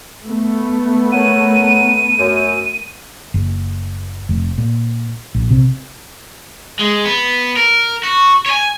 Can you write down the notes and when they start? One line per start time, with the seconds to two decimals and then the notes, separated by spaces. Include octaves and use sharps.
0.25 A3 B3
1.12 A#4 C#5 F#5 D#7
2.18 F#2
3.34 F#1
4.29 F1
4.58 A#2
5.35 A#1
5.51 C3
6.79 G#3
7.05 B3
7.57 A#4
8.03 F#4
8.46 C#5 G#5